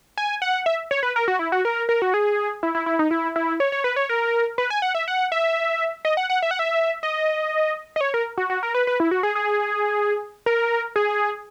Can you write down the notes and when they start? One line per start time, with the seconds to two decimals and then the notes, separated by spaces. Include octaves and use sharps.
0.17 G#5
0.42 F#5
0.66 E5
0.91 C#5
1.03 B4
1.16 A#4
1.28 F#4
1.39 E4
1.52 F#4
1.65 A#4
1.89 A#4
2.02 F#4
2.14 G#4
2.63 E4
2.75 E4
2.86 E4
2.99 D#4
3.11 E4
3.36 E4
3.60 C#5
3.72 C#5
3.84 B4
3.96 C#5
4.09 A#4
4.58 B4
4.70 G#5
4.82 F#5
4.95 E5
5.08 F#5
5.32 E5
6.05 D#5
6.17 F#5
6.30 F#5
6.43 E5
6.51 F#5
6.59 E5
7.03 D#5
7.96 D#5
8.01 C#5
8.14 A#4
8.38 F#4
8.50 F#4
8.63 A#4
8.74 B4
8.87 B4
9.00 E4
9.11 F#4
9.23 G#4
9.35 G#4
10.46 A#4
10.96 G#4